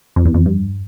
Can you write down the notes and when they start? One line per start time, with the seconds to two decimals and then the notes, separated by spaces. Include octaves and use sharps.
0.16 F2
0.25 E2
0.34 F2
0.46 G2